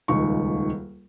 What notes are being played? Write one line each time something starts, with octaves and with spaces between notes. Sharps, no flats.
D#1 C#2 D#3 C#6